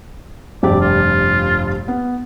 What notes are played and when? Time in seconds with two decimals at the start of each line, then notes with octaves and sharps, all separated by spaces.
0.63 F1 G2 G4 D5
0.81 F4
1.88 B3